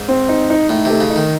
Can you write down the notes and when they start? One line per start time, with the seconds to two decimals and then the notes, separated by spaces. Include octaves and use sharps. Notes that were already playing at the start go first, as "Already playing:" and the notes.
Already playing: G#2
0.08 C4
0.29 D#4
0.50 D#4
0.69 A2 D#4
0.85 C3 A3
1.01 C#3
1.10 D#4
1.16 D#3